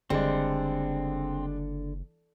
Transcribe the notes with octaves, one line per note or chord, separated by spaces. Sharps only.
F#1 D3 G3 G#3 C4 D4